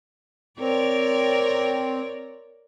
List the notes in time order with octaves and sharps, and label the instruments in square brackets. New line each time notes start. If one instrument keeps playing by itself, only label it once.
[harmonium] C4 [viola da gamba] A#4 C#5 D5